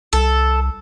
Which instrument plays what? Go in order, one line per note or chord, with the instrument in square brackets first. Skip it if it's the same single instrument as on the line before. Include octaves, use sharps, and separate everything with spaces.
[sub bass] C2 [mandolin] A4